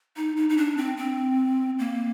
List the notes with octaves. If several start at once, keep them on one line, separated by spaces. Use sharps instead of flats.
D#4
D#4
D#4
D4
C4
C4
A#3